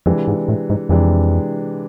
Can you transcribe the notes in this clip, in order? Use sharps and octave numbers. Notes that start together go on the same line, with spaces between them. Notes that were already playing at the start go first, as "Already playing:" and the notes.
F2 C3 E3 G#3 D4
G#2
A2
G#2
F2 C3 E3 G#3 D4